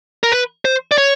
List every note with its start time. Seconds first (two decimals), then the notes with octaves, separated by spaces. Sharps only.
0.23 A#4
0.32 B4
0.65 C5
0.92 D5
0.98 C#5